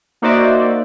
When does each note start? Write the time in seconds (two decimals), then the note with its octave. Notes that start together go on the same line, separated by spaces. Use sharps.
0.22 A#3 D#4 F#4 C5 D5 E5